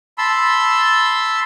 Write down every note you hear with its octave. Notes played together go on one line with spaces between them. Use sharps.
A5 B5 C6 E6